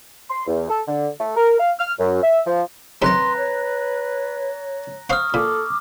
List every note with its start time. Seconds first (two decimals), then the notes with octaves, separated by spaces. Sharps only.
0.30 C6
0.47 E2
0.70 A4
0.88 D3
1.20 A3
1.37 A#4
1.60 F5
1.79 F6
1.99 F#2
2.23 E5
2.46 F3
3.02 F#2 C3 D#3 B4 A#5 C6 F#6 A#6
3.37 C#5
5.10 C5 F5 F#5 C#6 D#6 F6
5.34 A#2 A4 D6